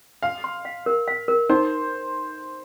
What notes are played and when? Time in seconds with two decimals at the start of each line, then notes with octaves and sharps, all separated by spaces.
0.23 F5 C6
0.44 C6
0.65 F5
0.86 A#4
1.07 F5
1.28 A#4
1.50 D#4 C5